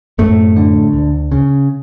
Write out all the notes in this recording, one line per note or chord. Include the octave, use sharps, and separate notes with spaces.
F#2 A2 A3
D3
D2
C#3